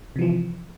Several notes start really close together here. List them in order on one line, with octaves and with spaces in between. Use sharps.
C3 E3 F3